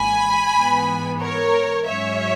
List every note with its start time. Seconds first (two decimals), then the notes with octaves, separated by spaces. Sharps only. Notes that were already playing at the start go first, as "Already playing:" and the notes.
Already playing: G#1 G#2 E3 A#3 G#5 B5
0.55 G#2 E3 B3
1.21 A#4 C#5
1.87 G#2 F#3 C#4 C#5 E5